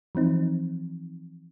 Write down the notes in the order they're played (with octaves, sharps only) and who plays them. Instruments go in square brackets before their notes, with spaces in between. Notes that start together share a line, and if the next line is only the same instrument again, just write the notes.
[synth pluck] E3 F3 C4 D#4